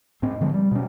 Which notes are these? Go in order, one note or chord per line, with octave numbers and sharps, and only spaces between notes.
G#2 C4
D3 F3 G#3
G3
B2 C#4